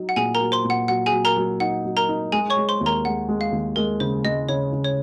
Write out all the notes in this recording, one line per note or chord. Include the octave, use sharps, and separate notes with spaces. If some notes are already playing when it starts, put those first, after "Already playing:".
Already playing: F#3 D#4
F#5
A#2 G#4 G#5
A#4 A#5
F#3
C5 C6
A#2
F#5
F#3 F#5
G#4 G#5
F#3
A#4 A#5
F#3
D#4 F#5
F#3
A#4 A#5
D#4
G#3 G#4 G#5
C#5 C#6
G#3
C5 C6
D#2
A#4 A#5
G#3 F#5
G#3
F5
D#2
G#3 A#4
C#3 C5
G#3 D#5
C#3 C#5
C#3
C#5